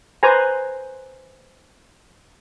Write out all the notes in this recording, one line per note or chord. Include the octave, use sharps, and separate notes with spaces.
B4 C5 G#5 A#5